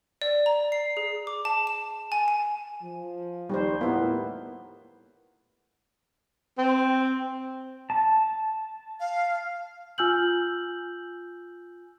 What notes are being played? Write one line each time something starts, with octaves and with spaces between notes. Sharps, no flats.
D5
A#5
C7
G#4
D6
A5
E7
G#5
G#5
F3
D#2 G3 D#4 C5
A2 A#3 B3 E4 F4 G4
C4
A5
F5
F4 G#5 E6 F6 G6 F#7